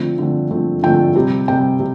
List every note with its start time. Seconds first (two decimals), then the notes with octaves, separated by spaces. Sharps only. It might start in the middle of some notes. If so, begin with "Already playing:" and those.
Already playing: D3 F3 A3 C4
0.18 D3 F3 A3 C4
0.51 D3 F3 A3 C4
0.83 D3 F3 A3 C4 G5
1.16 C3 G3 C4
1.48 C3 G3 C4 G5
1.79 C3